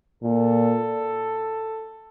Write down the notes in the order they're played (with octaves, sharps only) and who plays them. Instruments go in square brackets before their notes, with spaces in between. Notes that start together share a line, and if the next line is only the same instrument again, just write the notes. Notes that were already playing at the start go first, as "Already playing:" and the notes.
[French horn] A#2 [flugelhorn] A4